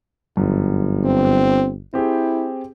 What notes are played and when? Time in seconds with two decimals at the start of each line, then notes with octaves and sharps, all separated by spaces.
0.37 G1 F#2
1.05 C4
1.94 C4 E4 G4 G#4